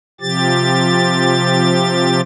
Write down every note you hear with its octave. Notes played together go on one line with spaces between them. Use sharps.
C3 F3 G4 A6